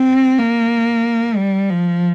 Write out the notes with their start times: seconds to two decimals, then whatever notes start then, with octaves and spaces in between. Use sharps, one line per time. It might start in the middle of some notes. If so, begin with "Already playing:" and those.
Already playing: C4
0.39 A#3
1.37 G3
1.70 F3